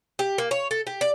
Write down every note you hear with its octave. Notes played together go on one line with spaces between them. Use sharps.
G4
A#3
C#5
A4
G4
D5